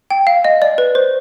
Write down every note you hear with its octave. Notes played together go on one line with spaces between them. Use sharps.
G5
F5
D#5
D5
B4
C5